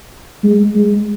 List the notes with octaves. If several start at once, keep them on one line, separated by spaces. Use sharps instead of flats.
G#3
G#3